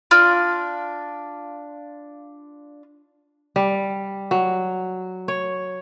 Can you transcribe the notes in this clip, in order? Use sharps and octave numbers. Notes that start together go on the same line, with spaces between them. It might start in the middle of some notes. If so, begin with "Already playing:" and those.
D4 F4
G3
F#3
C#5